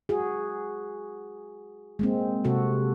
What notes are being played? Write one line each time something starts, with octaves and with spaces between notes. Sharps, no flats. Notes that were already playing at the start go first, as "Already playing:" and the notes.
F#4 G#4
G#3 A#3 C4
C3 F#4 A4